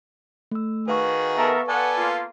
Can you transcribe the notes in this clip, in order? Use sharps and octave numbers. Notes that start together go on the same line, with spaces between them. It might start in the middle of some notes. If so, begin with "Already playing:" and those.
A3 E6
D#3 F#4 G#4 B4 F5 C#6
B3 A4 A#4 E5
B3 A4 D5 F#5 G#5
A#3 F4